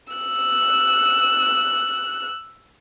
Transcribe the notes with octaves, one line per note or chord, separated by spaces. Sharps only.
E6 F#6